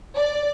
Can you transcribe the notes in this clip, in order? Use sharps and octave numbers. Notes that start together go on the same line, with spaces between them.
D5